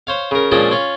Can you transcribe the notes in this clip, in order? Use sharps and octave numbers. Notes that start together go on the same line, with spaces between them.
C5 C#5 F5
C#3 A#4
A#2 F3 G#3 C#4 D4 G#4
C#4 F4 F5